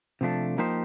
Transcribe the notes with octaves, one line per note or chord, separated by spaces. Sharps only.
C3 F3 A3 D4
F3 A#3 D#4 G4 C5